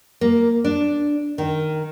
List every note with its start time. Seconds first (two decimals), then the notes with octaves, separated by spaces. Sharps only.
0.21 A#3
0.64 D4
1.38 D#3